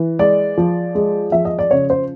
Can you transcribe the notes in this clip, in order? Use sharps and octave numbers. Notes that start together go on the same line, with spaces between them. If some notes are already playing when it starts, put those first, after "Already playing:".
Already playing: E3
G#3 D5
F3
G#3
F3 E5
D#5
D5
C#3 C#5
C5